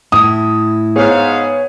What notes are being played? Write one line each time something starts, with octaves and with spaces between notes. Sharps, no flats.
A2 E4 D#6
G#2 B3 G#4 C#5 F5